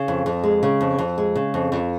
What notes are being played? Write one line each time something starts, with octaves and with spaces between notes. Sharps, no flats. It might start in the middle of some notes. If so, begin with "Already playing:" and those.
Already playing: C#3
F2
F2
G#3
C#3
F2
F2
G#3
C#3
F2
F2